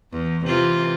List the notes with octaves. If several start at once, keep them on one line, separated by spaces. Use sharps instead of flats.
E2
C3 E3 F4